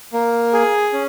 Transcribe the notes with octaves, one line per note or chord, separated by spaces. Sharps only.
A#3
G#4
C#4